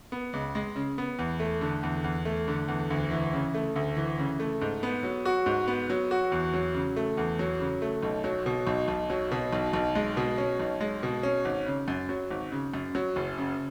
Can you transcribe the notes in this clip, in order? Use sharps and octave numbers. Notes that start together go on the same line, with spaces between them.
B3
C#2
G#3
C#3
B3
E2
A3
D3
E2
E2
A3
D3
E2
D2
E3
C#3
A3
D2
E3
C#3
A3
G#2
B3
F#3
F#4
G#2
B3
F#3
F#4
E2
F#3
C#3
A3
E2
F#3
C#3
A3
B1
F#3
B2
B1
B1
F#3
B2
B1
B1
G#3
B2
C#4
B1
G#3
B2
C#4
G#1
C#3
F#2
F#3
G#1
C#3
F#2
F#3
F#1
C#3